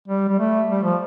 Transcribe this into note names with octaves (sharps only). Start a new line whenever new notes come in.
G3
G3
A3
G3
F3